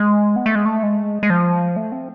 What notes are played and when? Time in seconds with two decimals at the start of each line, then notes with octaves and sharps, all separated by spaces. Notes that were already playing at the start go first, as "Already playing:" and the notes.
Already playing: G#3
0.36 B3
0.46 A3
0.55 G#3
0.65 A3
0.83 G#3
1.23 G#3
1.30 F3
1.76 A3
1.92 C4